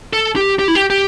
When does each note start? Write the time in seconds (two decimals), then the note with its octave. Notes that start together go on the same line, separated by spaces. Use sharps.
0.13 A4
0.36 G4
0.59 G4
0.68 E4
0.75 G4
0.90 G4